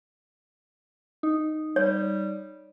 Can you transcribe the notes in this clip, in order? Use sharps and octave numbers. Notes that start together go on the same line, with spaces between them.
D#4
G3 C#5